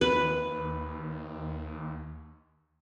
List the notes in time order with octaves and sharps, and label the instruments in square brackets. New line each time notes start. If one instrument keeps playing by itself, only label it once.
[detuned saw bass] D#2 [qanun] B4